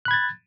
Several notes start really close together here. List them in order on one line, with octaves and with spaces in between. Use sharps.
F#6 B5 G#6 A6